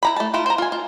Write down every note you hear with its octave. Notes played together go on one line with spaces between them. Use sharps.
E4 A#5 B5
A3 A5
A3 E4 F4 B5
C5 A#5
F4 G#5
F4